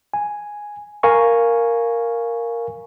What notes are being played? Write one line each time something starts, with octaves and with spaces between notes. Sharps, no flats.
G#5
A#4 F5 G#5 A#5 C#6